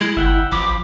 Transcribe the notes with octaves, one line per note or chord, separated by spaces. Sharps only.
G#3 E4
G1 E5 F#5 G5
A1 F3 B5 D6